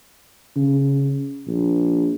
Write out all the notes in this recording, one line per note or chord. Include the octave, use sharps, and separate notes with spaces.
C#3
A#1